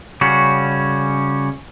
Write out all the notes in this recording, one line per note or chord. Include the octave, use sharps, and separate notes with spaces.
C#3 G3 C#4 F#4